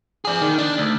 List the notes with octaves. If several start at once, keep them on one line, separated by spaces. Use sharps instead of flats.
G#4 D5
D#3
D4
D2